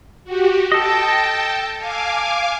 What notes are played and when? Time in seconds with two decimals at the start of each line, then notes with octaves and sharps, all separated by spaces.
0.25 F#4 G4
0.72 A4 D#5 G5 A5
1.79 F5 G#5 D6